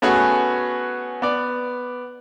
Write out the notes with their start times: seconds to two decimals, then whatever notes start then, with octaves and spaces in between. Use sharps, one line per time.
0.02 A3 B3 C#4 F#4 G#4
1.22 B3 D5